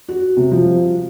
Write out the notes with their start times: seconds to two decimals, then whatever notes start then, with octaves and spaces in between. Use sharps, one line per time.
0.09 F#4
0.37 C3
0.52 F3